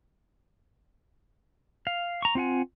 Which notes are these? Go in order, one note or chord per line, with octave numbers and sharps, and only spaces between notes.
F5
A#5 C#6
C4 F4 F#5 G#5